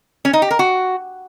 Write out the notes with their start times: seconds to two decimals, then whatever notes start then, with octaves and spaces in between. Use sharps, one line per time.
0.25 C#4
0.33 D#4
0.42 G4
0.51 A#4
0.59 F#4